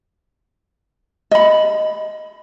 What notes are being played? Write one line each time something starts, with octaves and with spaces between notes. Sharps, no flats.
D#5 B5